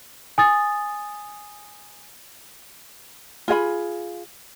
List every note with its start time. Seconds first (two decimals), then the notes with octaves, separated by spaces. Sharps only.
0.38 G#5 D#6 A6
3.48 F4 G#4 F5 B5